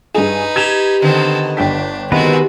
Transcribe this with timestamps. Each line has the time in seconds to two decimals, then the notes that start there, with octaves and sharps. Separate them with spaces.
0.15 G2 D#4 G#4 B4
0.56 G4 G#6 E7 F7
1.02 D3 D#3 B3 C4 A4
1.57 G1 D4 G5 B6
2.12 C3 D#3 G#3 B3 F#4 B4